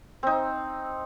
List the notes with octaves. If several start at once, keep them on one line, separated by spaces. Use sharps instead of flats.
C4 D#4